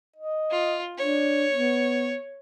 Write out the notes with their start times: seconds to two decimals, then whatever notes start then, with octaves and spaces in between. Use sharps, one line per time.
0.16 D#5
0.51 F4
0.98 D4 C#5
1.52 B3